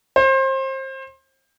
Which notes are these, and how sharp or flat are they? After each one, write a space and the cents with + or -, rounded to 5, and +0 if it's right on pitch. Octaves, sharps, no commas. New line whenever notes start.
C5 +30